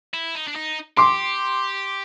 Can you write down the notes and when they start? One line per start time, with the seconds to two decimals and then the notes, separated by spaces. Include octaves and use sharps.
0.14 E4
0.35 D#4
0.47 D4
0.56 D#4
0.97 G4 C6 D6